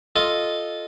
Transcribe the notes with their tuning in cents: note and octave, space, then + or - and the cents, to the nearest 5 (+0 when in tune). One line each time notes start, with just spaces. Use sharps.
F4 +0 A4 -10 D#5 -5